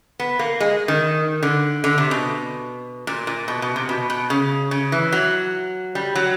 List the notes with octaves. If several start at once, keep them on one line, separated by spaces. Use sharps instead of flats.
B3
A#3
G#3
D#3
D3
D3
C3
B2
A#2
A#2
B2
B2
C3
B2
B2
C#3
C#3
E3
F#3
G3
F#3